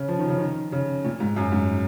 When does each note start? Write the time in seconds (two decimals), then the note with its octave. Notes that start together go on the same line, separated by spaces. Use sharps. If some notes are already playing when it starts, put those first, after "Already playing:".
Already playing: C#3
0.08 F3
0.18 D#3
0.29 C#3
0.38 D#3
0.72 C#3
1.04 A#2
1.20 G#2
1.36 F#2
1.52 G#2